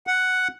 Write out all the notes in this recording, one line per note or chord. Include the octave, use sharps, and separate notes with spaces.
F#5